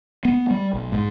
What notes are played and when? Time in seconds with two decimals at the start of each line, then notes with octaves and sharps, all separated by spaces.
0.25 B3
0.51 G3
0.74 B1
0.92 G#2